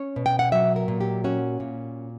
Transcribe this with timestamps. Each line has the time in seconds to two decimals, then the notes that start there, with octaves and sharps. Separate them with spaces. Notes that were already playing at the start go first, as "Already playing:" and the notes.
Already playing: C#4 C#5
0.16 B2
0.26 G5
0.39 F#5
0.52 F#3 E5
0.76 A#4
0.88 A#2
1.01 G4
1.24 C#4 F#4
1.60 A#2